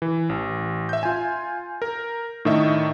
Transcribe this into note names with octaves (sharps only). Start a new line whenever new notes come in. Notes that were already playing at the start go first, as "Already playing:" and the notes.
E3
A1
E5 G6
F4 G#5
A#4
A2 D#3 D4 D#5 E5 C#6